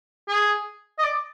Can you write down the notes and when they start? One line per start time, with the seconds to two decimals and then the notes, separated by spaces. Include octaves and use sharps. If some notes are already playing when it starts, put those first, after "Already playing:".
0.29 G#4
0.99 D#5
1.04 D5